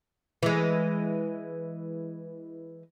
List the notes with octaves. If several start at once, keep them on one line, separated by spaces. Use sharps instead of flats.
E3 G#3